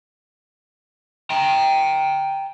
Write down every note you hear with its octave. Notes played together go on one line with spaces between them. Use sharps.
G5 A#5